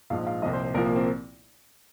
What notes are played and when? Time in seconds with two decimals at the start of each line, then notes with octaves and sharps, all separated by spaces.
0.10 A#1 G#2 F3 F5
0.27 F5
0.42 C2 A#2 F3 D#5
0.53 C5
0.63 C5
0.74 C2 A#2 F3 A#4
0.85 A#3
0.96 C4